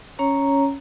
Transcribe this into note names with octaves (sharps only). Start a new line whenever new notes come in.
C#4 C#5 A#5